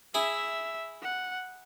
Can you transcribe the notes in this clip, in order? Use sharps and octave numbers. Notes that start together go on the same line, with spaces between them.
E4 G#4 E5
F#5